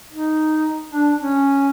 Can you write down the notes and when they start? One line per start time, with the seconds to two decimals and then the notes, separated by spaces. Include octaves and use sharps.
0.11 D#4
0.89 D4
1.18 C#4